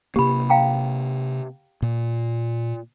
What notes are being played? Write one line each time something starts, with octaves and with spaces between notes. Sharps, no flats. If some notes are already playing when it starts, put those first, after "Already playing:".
C3 A#3 G4 B5
F5 G5 A#5
A#2